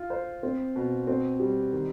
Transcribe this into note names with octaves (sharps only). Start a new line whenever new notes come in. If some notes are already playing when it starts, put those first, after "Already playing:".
Already playing: F4
C5
C4
B2
C4
G3
D#3